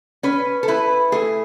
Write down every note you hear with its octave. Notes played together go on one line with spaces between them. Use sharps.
C#4 B4
A4
E4 B4
A3 G#4